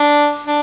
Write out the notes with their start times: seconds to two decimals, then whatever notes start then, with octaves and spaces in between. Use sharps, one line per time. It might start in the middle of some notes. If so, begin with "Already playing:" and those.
Already playing: D4
0.47 D4